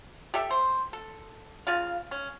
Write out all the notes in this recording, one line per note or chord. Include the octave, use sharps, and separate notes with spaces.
G4 A4 E5
C5
A4
C#3 F4 F5
C#4